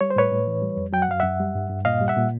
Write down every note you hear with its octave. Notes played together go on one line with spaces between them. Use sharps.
G3 C#5
C5
A2 B4 C#5
A2
E3
G3
F2
F#3 G5
F#5
F#2 F5
F#2 E5 F#5
G3
G2
G2
A#2 D#5 F5
G3
E5 F#5
A#2